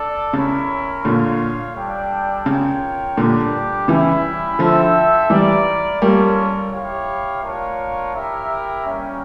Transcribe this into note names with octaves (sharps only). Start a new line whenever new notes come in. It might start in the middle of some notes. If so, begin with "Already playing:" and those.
Already playing: D4 A4 D5
C#3 C#4 E4 A#4 C#5
A#2 D3 F4 C#5 F5
G3 D4 A4 D5 G5
C#3 F4 A#4 C#5 G5
A#2 D3 G3 D4 G4
C#3 E3 G3 C#4 E4
D3 F3 F4 A4 E5 G5
E3 G3 E4 A#4 D5
G3 A#3 C#4 F4 A4 C#5
E4 G4 C#5 F5
A3 D4 F4 A#4 C#5
E4 G4 A#4 E5
G3 A#3 C#4